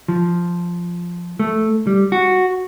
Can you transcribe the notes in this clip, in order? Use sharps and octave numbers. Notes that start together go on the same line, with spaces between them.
F3
A3
G3
F#4